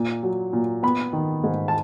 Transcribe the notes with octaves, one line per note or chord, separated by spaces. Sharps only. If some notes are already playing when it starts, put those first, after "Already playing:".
Already playing: A#2
F#3
A#2
B3 B5
D#3
G#2
A5